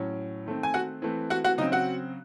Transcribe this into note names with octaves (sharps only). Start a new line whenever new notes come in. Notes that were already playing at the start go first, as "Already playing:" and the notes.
Already playing: A2 F#3 C#4
D#3 A3 C4
G#5
F#4 F#5
E3 A3 C4
F#4 F#5
F#4 F#5
C#3 F#3 C4 D#4 D#5
F#4 F#5